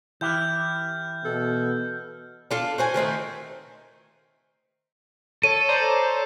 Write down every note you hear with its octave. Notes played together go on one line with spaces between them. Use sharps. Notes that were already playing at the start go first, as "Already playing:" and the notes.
E3 E4 G4 F6 G6
B2 A4
D4 F4 A4
F#4 C5 G#5
D#3 A3 C4 D#4
A4 C#5 D#7
C5 D5 A#5